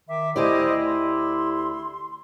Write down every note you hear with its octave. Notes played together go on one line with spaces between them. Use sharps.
D#3 E5 D6
D2 E4 G4 C5 D5 D#5 G#5
C6